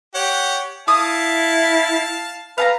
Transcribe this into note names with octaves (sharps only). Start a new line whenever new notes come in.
G4 C#5 F#5
E4 F5 A5 D#6
B4 F5 A5 A#5